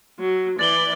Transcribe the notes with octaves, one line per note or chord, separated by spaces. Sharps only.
F#3
E3 D5 A6 F#7 G7